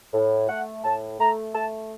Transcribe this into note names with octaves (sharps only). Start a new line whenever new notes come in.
A2
A3 F#5
A2 A5
A3 A#5
A3 A5